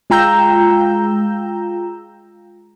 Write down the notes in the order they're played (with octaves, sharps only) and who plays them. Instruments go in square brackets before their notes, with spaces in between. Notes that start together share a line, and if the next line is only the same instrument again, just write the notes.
[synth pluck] G#3 F4 G5 A#5 E6 G6